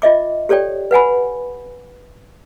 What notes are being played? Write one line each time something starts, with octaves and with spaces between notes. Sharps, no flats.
F4 D#5 E5 D6
G4 A4 C#5 D5 G5
B4 F#5 G#5 B5